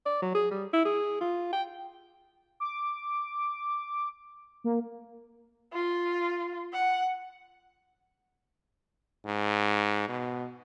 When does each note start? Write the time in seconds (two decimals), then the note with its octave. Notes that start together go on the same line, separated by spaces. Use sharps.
0.06 D5
0.22 F#3
0.35 G#4
0.51 G3
0.73 E4
0.85 G#4
1.21 F4
1.53 G5
2.60 D6
4.64 A#3
5.73 F4
6.73 F#5
9.26 G#2
10.08 B2